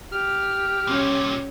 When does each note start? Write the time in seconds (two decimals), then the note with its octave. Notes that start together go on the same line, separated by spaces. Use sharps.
0.12 G4 F6
0.87 C2 A#2 C#4